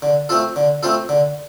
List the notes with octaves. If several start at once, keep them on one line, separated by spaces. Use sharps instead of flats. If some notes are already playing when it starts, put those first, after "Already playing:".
D3
A3 C4 F4 A4
D3
A3 C4 F4 A4
D3